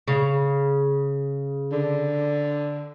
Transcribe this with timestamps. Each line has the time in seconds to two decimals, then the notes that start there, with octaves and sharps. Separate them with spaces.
0.08 C#3
1.72 D3